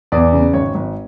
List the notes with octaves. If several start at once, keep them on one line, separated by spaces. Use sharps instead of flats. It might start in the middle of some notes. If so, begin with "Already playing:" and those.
E2 D5
C#3
G#1 C#5
G#1